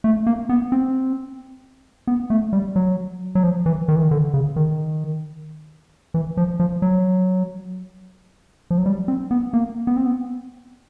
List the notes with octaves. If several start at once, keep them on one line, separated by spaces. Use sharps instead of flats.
A3
A#3
B3
C4
B3
A3
G3
F#3
F#3
F3
E3
D#3
E3
D#3
D3
C#3
D#3
E3
F3
F3
F#3
F3
F#3
G3
C4
B3
A#3
B3
C4
B3